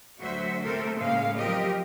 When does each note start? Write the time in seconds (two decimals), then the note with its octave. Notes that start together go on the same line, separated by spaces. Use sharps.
0.20 D2 F#3 F#4 C5 E5
0.63 C3 A3 A4 A#4 C5
0.96 A2 C#3 G#3 A#3 F5
1.37 F#2 F3 C4 G4 A#4 D#5